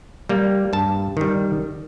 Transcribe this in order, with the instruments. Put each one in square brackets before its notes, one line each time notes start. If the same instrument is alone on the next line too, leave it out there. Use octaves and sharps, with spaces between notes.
[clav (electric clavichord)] G3 A#3
G2 A5
D#3 G3